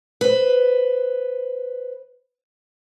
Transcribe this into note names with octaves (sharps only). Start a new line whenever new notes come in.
B4 C5